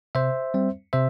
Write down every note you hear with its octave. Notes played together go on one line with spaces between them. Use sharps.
C3 C5 E5
G3 C4
C3 C5 E5